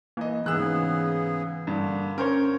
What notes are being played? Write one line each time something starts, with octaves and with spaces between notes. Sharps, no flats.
E3 A#3 D#5
G#2 C#3 E3 B3 G#4 E6 F#6
G2 D3 A#3
C#4 A#4 C5 C#5